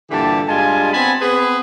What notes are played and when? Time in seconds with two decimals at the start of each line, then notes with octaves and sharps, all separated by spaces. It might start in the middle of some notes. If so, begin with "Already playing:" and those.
0.11 G2 A#2 D3 E3 G4 A5
0.48 G2 G3 G#3 F4 G#5 A5
0.92 B3 C4 G#5 A5 B5
1.21 B3 C4 G#4 B4